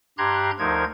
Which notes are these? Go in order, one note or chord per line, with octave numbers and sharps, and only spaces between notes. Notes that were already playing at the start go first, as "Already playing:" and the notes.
G2 G4 A#5 C6 F#6 G#6
D2 F3 D#4 A#4 C5 G#6